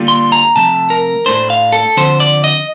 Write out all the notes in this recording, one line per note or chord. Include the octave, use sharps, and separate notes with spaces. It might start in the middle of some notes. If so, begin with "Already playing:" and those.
Already playing: D3 G3 A#3 F4
C6
A#5
C3 F3 A3 A5
A#4
A2 A3 D4 C5
F5
A4
D3 F3 C4 C5
D5
D#5